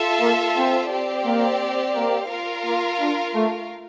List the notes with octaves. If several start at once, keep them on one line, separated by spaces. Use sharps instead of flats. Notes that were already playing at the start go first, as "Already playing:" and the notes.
Already playing: F4 A4 E5 A5
A#3
C4
C4 G4 D5
A#3
A#3
F4 A#4 F5
A#3
D4
A3